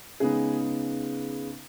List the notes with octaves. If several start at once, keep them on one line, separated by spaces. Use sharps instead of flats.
C#3 G#3 B3 D#4 G#4